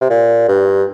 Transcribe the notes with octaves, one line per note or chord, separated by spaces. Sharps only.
C3
A#2
G2